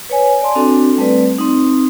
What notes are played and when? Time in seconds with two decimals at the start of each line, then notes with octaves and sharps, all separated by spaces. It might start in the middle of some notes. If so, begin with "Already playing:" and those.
0.10 B4 C#5 G#5
0.42 D5 G#5 A5 C6
0.55 C4 D4 F#4 A4
0.97 G3 A3 C4 B4 D5
1.38 C4 D#4